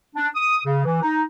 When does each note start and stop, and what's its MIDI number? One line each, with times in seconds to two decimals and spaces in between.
0.16 0.29 62
0.35 0.59 87
0.65 0.82 49
0.84 1.00 52
1.02 1.22 63